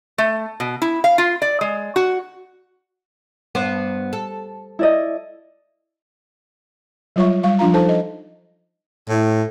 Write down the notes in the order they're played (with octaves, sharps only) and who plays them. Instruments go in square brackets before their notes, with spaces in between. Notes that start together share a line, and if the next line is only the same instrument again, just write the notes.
[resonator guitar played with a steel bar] A3
B2
E4
F5
F4
D5
G#3
F#4
[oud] G2 B3 C5
A4
[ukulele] E4 D5 D#5
[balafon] F#3 G3 F4 C#5 E5 C#6
G3 F5 C#6
F3 D4 F4 F5 A#5
D4 D#4 A4 C5 A5
D#5
[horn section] A2